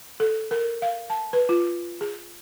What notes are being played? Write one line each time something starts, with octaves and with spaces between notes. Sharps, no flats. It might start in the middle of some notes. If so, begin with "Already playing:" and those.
A4
A#4
F5
A5
B4
F4
G#4